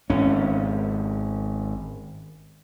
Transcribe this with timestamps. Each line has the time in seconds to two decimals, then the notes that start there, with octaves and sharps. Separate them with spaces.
0.10 G#1 C#4